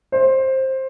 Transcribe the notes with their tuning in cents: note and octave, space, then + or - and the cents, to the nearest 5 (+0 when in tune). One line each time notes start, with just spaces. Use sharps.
C5 +15